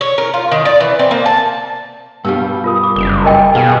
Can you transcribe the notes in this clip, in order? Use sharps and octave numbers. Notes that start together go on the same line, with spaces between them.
C#5
A#4
F4
D#3
D5
E3
C4
A#3
A5
G2 B2 G3 F5 E6
F4 A#4 D#6
D6
F#1
A#4 D#5 G5
B2 G#4 F5